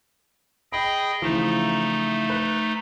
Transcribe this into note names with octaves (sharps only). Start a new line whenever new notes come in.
G#4 D#5 G5 B5
C#3 E3 F3 A3 D#4
B4